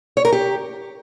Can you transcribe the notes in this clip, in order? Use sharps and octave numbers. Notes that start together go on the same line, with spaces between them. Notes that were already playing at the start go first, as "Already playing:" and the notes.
C#5
A#4
G4